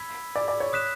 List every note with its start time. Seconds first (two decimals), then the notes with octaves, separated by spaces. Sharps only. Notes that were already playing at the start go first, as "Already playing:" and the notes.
Already playing: B5 E6 G#6 B6
0.36 D5
0.48 D5
0.60 C#5
0.73 D#6 F#6 B6 E7